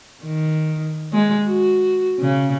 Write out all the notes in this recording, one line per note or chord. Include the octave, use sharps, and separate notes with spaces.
D#3
G#3
F#4
C#3